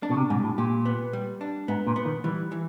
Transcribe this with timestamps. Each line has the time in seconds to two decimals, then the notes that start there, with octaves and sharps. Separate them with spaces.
0.03 D4
0.10 B2
0.17 C3
0.30 G#2 G3
0.44 A2
0.58 A#2 G4
0.85 B3
1.13 G3
1.41 D4
1.68 G#2 B3
1.87 A#2
1.96 B3
2.06 D#3
2.24 E3 G3
2.52 E3